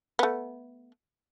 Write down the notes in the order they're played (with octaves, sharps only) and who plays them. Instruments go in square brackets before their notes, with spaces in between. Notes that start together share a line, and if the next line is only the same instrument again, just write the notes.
[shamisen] A3 B3